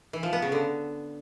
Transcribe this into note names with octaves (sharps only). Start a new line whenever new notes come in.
E3
F3
B3
C#3
D3